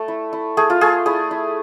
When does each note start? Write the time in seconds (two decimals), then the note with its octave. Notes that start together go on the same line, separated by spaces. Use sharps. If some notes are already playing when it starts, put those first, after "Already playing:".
Already playing: A3 A4
0.08 E4
0.33 E4
0.57 A3 G#4
0.70 F4
0.81 A3 G#4
1.06 E4 G#4
1.31 E4